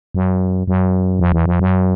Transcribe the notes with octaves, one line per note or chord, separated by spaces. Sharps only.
F#2
F#2
F2
E2
F2
F#2